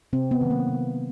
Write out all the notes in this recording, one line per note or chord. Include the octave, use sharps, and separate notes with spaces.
C3 C4
B3
D#3 F#3
A#3
C3